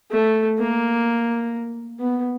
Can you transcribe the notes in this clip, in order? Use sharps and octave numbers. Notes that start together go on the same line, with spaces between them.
A3
A#3
B3